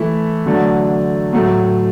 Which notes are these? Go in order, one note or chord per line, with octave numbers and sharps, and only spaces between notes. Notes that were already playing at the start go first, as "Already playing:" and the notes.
Already playing: E3 A3 E4
D3 F#3 A3 D4
A2 F#3 A3